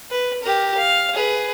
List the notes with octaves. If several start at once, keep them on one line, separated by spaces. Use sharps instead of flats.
B4
G4 A#4
F5
G#4 B4